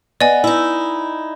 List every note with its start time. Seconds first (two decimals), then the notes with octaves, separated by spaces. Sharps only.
0.21 B3 D5 D#5 G#5
0.44 D#4 E4